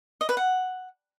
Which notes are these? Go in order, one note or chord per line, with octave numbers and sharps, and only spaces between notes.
D#5
B4
F#5